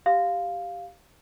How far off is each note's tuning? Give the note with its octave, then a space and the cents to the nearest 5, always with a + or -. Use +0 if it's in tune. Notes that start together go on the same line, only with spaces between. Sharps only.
G4 -5 F5 +0